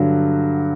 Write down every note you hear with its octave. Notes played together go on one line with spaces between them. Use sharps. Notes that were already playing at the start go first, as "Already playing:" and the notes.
Already playing: G2 D3 F#3